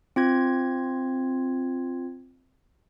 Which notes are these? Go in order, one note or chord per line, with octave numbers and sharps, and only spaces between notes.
C4 F4 G#6